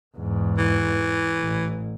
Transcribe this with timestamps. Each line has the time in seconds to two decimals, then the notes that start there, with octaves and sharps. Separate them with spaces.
0.17 E2 G#2
0.58 E3
1.40 A1